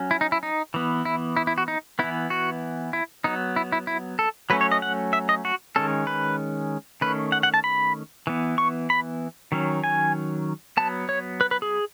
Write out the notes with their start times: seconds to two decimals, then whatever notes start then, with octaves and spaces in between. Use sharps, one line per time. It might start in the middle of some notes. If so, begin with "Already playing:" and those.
Already playing: F#3 C#4
0.11 E4
0.21 D#4
0.32 E4
0.43 D#4
0.74 E3 B3
1.05 E4
1.37 E4
1.47 E4
1.58 F#4
1.68 D#4
1.99 E3 B3 E4
2.30 F#4
2.93 E4
3.24 F#3 B3 D#4
3.56 E4
3.72 E4
3.87 E4
4.19 A4
4.50 F#3 A3 C#4 B4
4.61 C#5
4.72 D#5
4.82 F#5
5.13 E5
5.29 D#5
5.45 F#4
5.76 D#3 G#3 C#4 A4
6.07 B4
7.01 D#3 A3 C#4 B4
7.32 F#5
7.43 F#5
7.54 A5
7.64 B5
8.27 E3 B3
8.58 C#6
8.90 B5
9.52 D#3 F#3 C#4
9.84 G#5
10.77 F#3 B3 A5
11.09 C#5
11.41 B4
11.51 B4
11.62 G#4